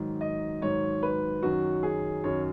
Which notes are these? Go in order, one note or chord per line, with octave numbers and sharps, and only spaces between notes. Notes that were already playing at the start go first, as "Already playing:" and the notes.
Already playing: G#2 D#3 F#3
D#5
G#2 D#3 F#3 C#5
B4
F#2 D#3 F#3 F#4
G#4
F#2 D#3 F#3 C#5